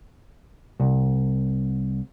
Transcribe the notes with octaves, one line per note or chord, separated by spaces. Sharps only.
C2